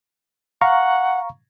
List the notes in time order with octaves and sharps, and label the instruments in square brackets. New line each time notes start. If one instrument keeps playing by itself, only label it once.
[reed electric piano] F5 A#5 C#6 [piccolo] F#5